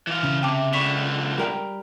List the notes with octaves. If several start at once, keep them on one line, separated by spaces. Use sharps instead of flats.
E3 F5
C#3
C3 G5 A5 D6
C#2 D3 B5 C#6 B6
G3 A#4 G5